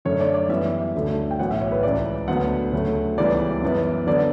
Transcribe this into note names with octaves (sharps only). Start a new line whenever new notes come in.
F#2 D3 A3 C#5
D5
D5
F#2 E3 G3 B3 E5
D2 D3 A3
G5
B1 A2 E3 F#5
E5
C#5
B4
C#2 C#3 E3 D5
D2 D3 F#3 B3 F#5
D2 C#3 F#3 A3
C#2 C#3 E3 G3 B3 D5
F#2 E3 B3
D3 F#3 B3 D5